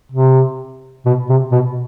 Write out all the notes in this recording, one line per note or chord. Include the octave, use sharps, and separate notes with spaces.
C3
B2
C3
B2